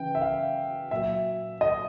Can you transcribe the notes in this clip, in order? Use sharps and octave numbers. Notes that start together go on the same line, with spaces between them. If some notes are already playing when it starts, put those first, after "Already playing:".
Already playing: C#3 E3 G5
E5
F5
A#2 F#3 E5
D#5